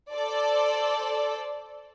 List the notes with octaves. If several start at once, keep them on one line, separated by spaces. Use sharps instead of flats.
A4 C5 D5